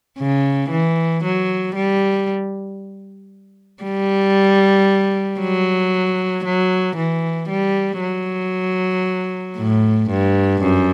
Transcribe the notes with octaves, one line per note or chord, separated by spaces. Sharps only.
C#3
E3
F#3
G3
G3
F#3
F#3
E3
G3
F#3
A2
G2
F#2